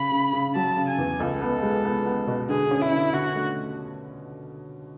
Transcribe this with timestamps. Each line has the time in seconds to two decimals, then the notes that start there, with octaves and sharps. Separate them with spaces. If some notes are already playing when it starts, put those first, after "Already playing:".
Already playing: C#3 B5
0.11 C#3
0.33 C#3
0.54 F#3 A5
0.77 C#3
0.88 G#5
0.98 E2
1.20 C#2 A4
1.42 B3
1.63 G#3
1.85 B3
2.06 B3
2.27 B2
2.49 D3 G#4
2.71 C#4
2.82 E4
2.92 D3
3.14 D3 F#4
3.35 A3